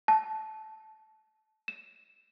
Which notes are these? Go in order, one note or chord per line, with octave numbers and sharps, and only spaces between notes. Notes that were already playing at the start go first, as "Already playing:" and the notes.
A5
E7